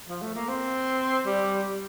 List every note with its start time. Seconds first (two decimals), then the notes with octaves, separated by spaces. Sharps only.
0.09 F3
0.22 A3
0.35 A#3
0.48 C4
1.26 G3